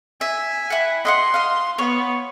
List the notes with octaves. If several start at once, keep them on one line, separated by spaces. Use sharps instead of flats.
E5 G#5
E4 F#5
D#5 E5 F#5 C6
D#5 F5
B3 C#5